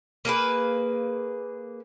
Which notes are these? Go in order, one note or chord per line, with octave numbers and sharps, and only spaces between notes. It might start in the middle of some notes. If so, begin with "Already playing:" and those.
A#3 G#4 A4 B4